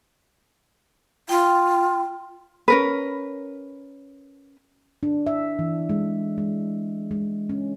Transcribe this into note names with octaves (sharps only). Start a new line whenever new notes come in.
F4 G5
C#4 A#4 B4
D4
E5
E3
G#3
G#3
G#3
C#4